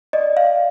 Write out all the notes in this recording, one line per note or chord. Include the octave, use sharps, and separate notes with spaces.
D5 D#5
F5